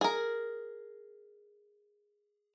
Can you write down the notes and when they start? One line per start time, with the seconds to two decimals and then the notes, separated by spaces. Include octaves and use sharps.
0.01 G#4 A#4